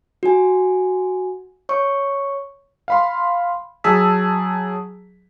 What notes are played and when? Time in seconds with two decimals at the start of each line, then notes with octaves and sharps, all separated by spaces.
0.23 F#4 G#5
1.69 C#5 C#6
2.88 F5 B5 C6
3.84 F#3 G#4 A5 E6 B6